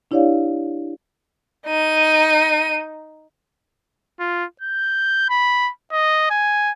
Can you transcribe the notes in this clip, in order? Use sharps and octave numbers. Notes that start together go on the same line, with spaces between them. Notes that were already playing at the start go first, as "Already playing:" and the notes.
D4 E4 G4 C#5 D5 F5
D#4 D#7
F4
G6
B5
D#5
G#5